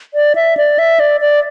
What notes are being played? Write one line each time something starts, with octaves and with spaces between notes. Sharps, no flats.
D5
E5
D5
E5
D5
D5